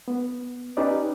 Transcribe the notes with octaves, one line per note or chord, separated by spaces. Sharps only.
B3
C#4 D#4 G4 B4 C#5 D5